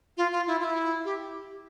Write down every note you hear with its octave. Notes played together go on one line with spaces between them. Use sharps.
F4
F4
E4
F4
E4
G4